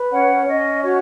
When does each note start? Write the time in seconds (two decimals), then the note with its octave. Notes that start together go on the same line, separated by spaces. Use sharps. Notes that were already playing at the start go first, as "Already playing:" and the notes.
Already playing: B4
0.10 C#4 C#5 F#5
0.46 C#4 D#5
0.81 F#4 C#5